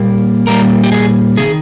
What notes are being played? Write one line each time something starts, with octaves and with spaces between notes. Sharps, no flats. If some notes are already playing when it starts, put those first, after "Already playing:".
Already playing: A#2 G3 A#3
A#2 G3 A#3 A#4
G4
G#4
C3 D#3 G#4